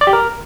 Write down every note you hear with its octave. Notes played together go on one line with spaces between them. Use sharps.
D5
G4
A#4